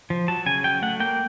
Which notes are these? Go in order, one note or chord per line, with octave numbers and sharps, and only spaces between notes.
F3
F#3 A5
C#3 G#5
F#3 G5
A3 F#5
A#3 G5